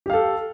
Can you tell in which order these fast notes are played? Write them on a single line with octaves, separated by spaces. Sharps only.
G4 F5 A4